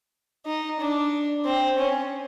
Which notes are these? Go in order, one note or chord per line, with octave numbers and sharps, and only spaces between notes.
D#4
D4
C4
C#4